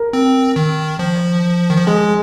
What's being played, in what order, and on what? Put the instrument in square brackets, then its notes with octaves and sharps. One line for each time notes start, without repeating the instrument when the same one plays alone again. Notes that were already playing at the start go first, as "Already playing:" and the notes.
Already playing: [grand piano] A#4
[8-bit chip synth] C4
D#3
F3
D#3
F3
[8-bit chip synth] G#3 [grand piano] G#4